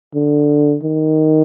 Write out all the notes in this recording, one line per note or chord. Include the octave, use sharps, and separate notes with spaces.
D3
D#3